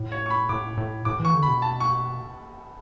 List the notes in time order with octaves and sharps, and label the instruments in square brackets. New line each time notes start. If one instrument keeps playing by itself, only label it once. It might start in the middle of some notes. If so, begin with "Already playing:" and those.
Already playing: [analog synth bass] A2
[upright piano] C#5
C#6
B5
[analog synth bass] A2 [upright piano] D6
[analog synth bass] A2
[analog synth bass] A2 [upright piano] D6
[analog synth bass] E3
[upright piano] C#6
[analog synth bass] D3
[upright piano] B5
[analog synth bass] B2
[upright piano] A5
C#6